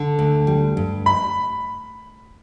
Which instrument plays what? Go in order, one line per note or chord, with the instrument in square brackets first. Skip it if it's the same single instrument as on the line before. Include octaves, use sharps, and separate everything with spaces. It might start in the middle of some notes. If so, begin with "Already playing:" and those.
Already playing: [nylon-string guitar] D3
D2
G3
G2
[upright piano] B5